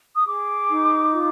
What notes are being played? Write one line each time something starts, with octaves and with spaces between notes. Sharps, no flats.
D#6
G#4 D6
D#4
F4